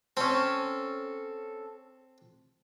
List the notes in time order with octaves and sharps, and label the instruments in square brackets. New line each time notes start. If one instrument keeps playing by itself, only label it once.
[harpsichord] C4 [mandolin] C#4 A4